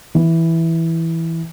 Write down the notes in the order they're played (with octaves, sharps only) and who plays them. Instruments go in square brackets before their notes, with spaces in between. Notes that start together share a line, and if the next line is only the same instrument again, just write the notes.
[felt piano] E3